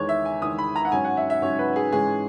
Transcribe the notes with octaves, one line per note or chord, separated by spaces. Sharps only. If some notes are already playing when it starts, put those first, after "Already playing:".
Already playing: E2 D#3 G#3 C#5
E5
G#5
E2 D#3 G#3 D#6
B5
A#5
F#5
G#2 F#3 C#4 G#5
F#5
E5
E5
G#2 F#3 C#4 C#5
B4
G#4
G#2 E3 G#3 C#4 G#4